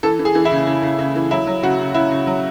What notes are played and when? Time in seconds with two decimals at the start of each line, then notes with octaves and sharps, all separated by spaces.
0.03 E3 A4
0.19 E3
0.25 G#4
0.35 E3
0.45 E4
0.52 C#3
0.67 C#3
0.82 C#3
0.98 C#3
1.16 E3
1.31 F#3 E4
1.47 F#3
1.63 C#3 F#4
1.79 C#3
1.94 C#3 E4
2.11 C#3
2.27 F#3